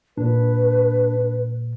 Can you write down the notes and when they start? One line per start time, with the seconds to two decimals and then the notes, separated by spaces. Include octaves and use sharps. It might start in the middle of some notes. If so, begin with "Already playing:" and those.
0.17 A#2 D4 B4